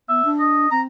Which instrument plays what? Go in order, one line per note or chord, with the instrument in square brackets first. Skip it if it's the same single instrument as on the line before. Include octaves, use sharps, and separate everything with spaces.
[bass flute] B3 [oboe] E5
[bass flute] D4
[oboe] D#5
[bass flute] C4 [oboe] A#5